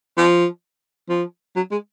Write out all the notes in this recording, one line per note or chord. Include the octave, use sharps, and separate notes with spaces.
F3
F3
F#3
G#3